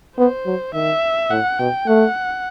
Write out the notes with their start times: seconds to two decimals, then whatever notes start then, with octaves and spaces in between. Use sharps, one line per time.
0.17 B3 C5
0.46 F#3
0.74 D#3 E5
1.30 A2 F#5
1.59 B2 G5
1.87 A3 F#5